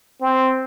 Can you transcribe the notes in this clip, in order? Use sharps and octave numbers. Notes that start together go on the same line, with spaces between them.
C4